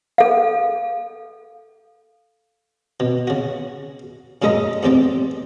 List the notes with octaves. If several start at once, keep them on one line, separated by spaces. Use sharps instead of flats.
A4 F5
B2
C#3 F#4
F#2 A#2 G#3 A4 D#5 A#5
E2 A2 C4 G4 D5